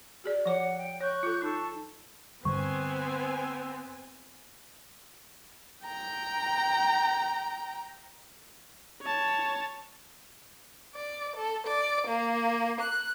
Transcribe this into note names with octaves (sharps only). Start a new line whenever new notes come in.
F#4 G#4 D5
F3 C#5 F#5 D6
G5
C#5 C#6 F#6 G6
F4 A4
D#4 A4 C#6
G2 D3 G3 B3 C4 C5 G#5 C#6
G5 A#5
C#5 A5
D5
A4
D5
A#3
F#6